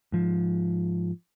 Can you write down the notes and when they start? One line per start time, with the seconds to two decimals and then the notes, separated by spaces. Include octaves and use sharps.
0.12 G#2 F3